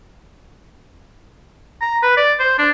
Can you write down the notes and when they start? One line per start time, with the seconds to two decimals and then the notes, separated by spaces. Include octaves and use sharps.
1.81 A#5
2.03 B4
2.17 D5
2.40 C5
2.58 D4